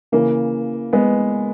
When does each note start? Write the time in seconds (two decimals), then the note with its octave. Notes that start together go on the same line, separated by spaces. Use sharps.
0.12 C#3 E3 A#3
0.93 G#3 B3